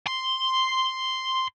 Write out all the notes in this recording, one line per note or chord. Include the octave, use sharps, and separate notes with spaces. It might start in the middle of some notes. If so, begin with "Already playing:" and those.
C6